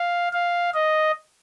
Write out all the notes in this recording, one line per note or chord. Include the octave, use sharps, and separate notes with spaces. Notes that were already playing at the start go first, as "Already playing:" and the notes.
Already playing: F5
F5
D#5